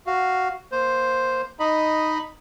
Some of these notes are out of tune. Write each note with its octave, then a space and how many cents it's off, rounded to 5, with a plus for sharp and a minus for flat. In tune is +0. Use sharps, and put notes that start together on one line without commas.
F#4 +0 F5 +0
A#3 +5 C5 +0
D#4 +0 D#5 -5 B5 +0